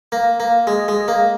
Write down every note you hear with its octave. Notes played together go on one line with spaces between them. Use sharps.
A#3
A#3
G#3
G#3
A#3